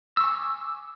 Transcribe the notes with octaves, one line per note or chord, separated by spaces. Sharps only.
G#5 C#6 D6 E6